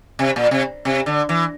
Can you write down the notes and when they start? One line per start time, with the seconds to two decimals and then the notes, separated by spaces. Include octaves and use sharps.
0.19 C3
0.36 A#2
0.51 C3
0.85 C3
1.06 D3
1.29 E3